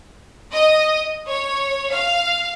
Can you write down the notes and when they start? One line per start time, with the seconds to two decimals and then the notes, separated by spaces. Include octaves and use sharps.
0.53 D#5
1.27 C#5
1.92 F5